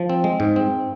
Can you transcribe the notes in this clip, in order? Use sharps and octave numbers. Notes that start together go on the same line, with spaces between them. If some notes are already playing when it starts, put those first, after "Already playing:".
Already playing: F3
C4
G#3
G#2
C4